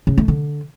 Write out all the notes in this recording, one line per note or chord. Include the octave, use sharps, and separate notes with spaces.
C#3
A3
D3